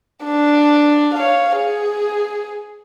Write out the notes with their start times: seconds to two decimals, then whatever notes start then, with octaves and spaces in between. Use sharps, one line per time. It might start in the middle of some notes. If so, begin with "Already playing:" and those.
0.23 D4
1.14 C#5 F5
1.57 G#4